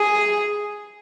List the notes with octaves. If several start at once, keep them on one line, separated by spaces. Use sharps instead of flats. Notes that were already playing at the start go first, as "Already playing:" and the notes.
Already playing: G#4